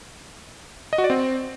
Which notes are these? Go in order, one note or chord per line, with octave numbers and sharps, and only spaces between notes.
D#5
F#4
D5
C4